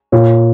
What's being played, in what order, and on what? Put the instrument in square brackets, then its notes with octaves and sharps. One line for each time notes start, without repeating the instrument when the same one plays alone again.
[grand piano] A#2 C#5